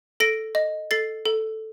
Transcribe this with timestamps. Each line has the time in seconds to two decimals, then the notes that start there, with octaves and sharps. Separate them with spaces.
0.20 A4 A#6 D7
0.55 D#5
0.91 A4 A6 C7
1.25 A4